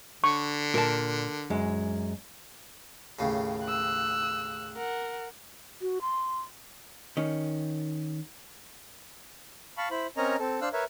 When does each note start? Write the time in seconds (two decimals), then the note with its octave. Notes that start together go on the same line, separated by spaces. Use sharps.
0.24 D3 C#6
0.74 A#2 A#4 A5
1.50 F#2 G#3 F#4
3.19 D#2 A2 C#3
3.64 E6 F#6
4.76 A#4 F#5
5.82 F#4
6.01 C6
7.17 D#3 C#4
9.78 F5 A5 B5 C#6
9.91 E4 C5 B5
10.17 C4 C#4 A#4 C#5 D#5 A#5
10.39 C4 A4
10.61 D4 C5 F5 E6 F#6
10.73 A#4 B4 C#5 E5